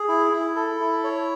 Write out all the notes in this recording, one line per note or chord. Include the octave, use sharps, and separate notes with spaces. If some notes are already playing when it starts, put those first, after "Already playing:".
Already playing: G#4
E4
E4
A4
E4
C#5